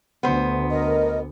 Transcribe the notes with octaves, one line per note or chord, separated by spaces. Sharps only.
D2 B3 C5
A#4 D#5